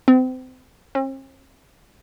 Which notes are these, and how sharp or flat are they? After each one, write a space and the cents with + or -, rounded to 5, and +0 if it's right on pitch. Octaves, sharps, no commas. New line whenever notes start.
C4 -30
C4 +45